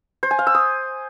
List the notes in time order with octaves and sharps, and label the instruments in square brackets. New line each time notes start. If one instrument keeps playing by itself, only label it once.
[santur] C5
G#5
F5
E6
D#6